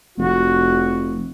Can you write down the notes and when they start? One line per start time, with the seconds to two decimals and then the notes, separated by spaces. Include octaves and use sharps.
0.18 F1 F#4